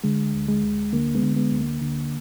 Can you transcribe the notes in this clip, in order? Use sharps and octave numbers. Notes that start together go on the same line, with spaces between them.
D3 G#3
D2
G#3
D2
D3 A#3
G#3 B3
D3
G#3 B3
D2
A#3
D3